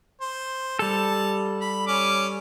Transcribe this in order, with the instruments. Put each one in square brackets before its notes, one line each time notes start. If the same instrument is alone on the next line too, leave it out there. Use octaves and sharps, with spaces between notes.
[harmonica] C5
[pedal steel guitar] G3 A4 [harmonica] A5
[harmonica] B5
C#4 D6